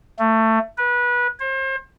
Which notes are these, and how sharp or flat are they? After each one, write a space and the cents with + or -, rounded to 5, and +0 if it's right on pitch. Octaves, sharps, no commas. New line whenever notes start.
A3 +20
B4 -25
C5 +35